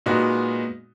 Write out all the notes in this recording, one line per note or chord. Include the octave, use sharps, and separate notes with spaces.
A#2 G#3 B3 D#4 F#4